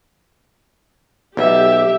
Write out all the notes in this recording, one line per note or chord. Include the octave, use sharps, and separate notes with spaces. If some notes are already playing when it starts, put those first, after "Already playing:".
B1 G4 E5